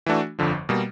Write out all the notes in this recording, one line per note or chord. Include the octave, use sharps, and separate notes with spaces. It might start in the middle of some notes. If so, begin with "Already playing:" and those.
E3 A3 D4 F#4
G1 F2 D3 F3
B2 G3 A#3